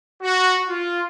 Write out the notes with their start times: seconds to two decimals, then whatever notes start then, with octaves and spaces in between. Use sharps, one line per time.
0.22 F#4
0.68 F4